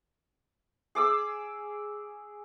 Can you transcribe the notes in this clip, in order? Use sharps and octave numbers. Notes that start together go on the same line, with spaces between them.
G#4 D6 E6